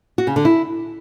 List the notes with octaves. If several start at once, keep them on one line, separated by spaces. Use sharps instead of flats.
F#4
C#3
D3
E4